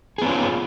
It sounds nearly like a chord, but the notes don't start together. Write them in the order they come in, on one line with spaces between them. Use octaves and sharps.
G#4 B3 C#4 F4